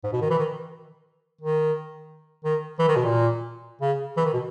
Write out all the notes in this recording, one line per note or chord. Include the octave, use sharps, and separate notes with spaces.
G#2
B2
D#3
E3
D#3
D#3
D#3
E3
D#3
B2
A#2
C#3
E3
D#3
B2